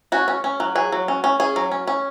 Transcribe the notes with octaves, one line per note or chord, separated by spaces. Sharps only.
C#4 F#4
C#4
C#4
F#3
F#3 G#4
F#3
C#4
C#4
C#4 G#4
F#3
C#4
C#4